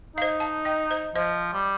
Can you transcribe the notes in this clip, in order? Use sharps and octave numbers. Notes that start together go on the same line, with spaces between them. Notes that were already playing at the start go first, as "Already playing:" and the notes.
D#4 F5
C5 D#5
F5 A5
D#5 G5
C5 D#5
F3 C5 D#5
G3